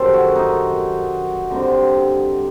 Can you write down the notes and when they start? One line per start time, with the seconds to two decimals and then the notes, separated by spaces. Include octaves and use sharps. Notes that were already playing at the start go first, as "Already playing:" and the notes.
Already playing: F#2 D#3 G3 A4 C5
0.13 F#4
0.36 D#4
1.50 D3 G3 C4 D#4